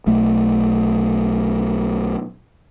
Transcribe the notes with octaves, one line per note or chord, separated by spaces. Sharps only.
B1 A3